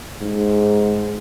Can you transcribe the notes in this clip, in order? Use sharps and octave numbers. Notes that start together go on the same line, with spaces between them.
G#2